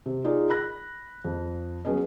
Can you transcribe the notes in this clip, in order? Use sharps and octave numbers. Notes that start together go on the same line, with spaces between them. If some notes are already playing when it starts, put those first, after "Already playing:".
C3
D#4 F4 G#4 D5
B5 F#6 A#6
F2
F#3 B3 C#4 G#4 D#5